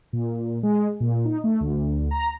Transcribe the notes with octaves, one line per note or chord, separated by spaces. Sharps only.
A#2
G#3
A#2
D#4
A3
D2
A#5